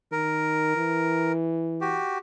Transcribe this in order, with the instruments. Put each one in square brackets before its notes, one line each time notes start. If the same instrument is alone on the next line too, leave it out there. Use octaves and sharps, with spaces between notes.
[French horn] D#3 [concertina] A#4
[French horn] E3
[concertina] F#4 G4